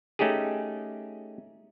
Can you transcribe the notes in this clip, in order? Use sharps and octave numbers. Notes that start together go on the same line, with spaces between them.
A3 C#4 D#4 G4 G#4